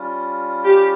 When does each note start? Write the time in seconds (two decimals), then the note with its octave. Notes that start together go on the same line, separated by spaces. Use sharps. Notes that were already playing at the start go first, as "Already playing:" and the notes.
Already playing: G3 C#4 F4
0.64 G4